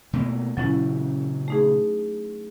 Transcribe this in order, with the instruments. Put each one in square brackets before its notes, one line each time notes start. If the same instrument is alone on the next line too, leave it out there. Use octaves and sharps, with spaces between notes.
[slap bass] B2 A3 A#3
[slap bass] A#2 C#3 E3 [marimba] F#3 C#4 E4
[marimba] A3 D#4 G#4